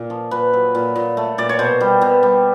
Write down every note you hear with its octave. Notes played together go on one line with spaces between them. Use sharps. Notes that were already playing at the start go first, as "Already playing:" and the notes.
Already playing: A#2
F3
A#2 B4
F#3
A#2
A#2
A3
A#2 D5
C#5
B2 C5
G3
B2
G3